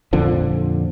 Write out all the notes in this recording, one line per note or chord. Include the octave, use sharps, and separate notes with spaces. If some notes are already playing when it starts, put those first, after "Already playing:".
F2 A#2 D3 F3